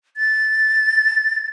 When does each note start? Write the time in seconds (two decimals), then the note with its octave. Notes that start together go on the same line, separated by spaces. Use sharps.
0.17 A6